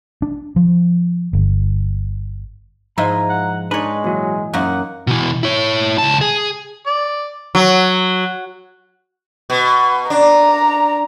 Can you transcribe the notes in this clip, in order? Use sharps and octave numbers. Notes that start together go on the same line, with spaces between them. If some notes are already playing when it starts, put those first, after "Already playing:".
D4
F3
G1
G#2 F3 E4 F4 D#5 A#5
F#5
G#3 D4 D#4 B4 C#5
A#2 E3 F#3
F#2 A#3 D#4 F#5
B2 E3
E4 C#5
C#2 A5
G#4
D5
F#3
B2
D4 A#5